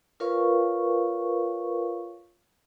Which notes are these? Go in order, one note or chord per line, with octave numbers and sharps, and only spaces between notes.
F4 A#4 B4 C#5 F5 C#6